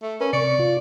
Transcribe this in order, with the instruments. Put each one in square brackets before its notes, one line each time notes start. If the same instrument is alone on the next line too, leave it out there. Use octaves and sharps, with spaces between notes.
[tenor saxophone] A3
[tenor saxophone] C#4 [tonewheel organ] A#4 B4
[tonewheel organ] C3 C#6 [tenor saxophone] D5
[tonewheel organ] F4